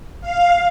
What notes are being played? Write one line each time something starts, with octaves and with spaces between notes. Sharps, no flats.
F5